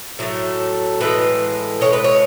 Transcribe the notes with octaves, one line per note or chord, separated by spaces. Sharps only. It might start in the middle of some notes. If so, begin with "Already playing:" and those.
A2 F#3 A3
A2 E3 G#3 B4
A2 E3 G#3 C#5
B4
C#5